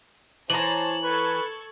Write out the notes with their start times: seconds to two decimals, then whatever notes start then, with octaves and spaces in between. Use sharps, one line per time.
0.50 E3 C5 C#5 A5 A#5 F#7
1.03 A4 B4 C#6 G#6